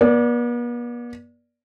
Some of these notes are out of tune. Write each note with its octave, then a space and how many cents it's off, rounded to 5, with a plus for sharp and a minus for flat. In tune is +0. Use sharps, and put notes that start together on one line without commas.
B3 -45 D5 +0